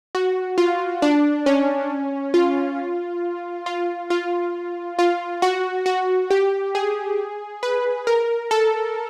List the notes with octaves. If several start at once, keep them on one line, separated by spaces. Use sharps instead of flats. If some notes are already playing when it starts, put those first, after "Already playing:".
F#4
F4
D4
C#4
F4
F4
F4
F4
F#4
F#4
G4
G#4
B4
A#4
A4